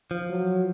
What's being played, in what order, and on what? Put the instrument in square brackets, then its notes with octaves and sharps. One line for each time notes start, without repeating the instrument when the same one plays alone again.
[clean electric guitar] F3
[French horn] F#3